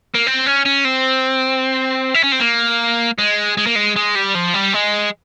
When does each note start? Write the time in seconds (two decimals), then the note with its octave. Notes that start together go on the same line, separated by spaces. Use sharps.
0.14 A#3
0.27 C4
0.46 C#4
0.65 C#4
0.85 C4
2.14 E4
2.24 C#4
2.32 C4
2.40 A#3
3.18 G#3
3.57 G#3
3.66 A#3
3.76 G#3
3.96 G#3
4.16 G3
4.35 F3
4.54 G3
4.74 G#3